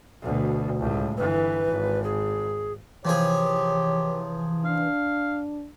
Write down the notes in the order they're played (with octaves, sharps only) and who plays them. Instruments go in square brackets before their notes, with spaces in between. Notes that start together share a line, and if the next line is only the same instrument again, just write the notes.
[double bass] D2 B2
C#2 A2
[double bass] G1 E3 [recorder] B4
[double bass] G#1
[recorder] G#4
[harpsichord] C3 F3 G#4 [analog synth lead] E3 [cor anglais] G4 [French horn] C#5
[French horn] D4 [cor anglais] F5